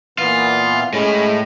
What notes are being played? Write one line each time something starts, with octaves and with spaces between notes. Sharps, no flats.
A#2 E3 B3 F4
A2 G#3 C#4 B5